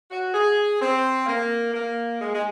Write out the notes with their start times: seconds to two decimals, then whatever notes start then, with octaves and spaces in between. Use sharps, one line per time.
0.11 F#4
0.33 G#4
0.80 C4
1.26 A#3
1.73 A#3
2.20 G#3
2.34 G#3